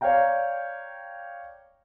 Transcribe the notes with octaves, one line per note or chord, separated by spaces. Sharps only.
C#5 D5 F5 G5 A#5